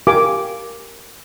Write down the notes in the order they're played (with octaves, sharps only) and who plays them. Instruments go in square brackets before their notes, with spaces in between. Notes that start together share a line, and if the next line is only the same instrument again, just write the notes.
[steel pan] G4 A#4 F5 G#5 D6